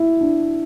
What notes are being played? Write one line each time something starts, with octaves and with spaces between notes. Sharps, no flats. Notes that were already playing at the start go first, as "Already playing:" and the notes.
Already playing: E4
D4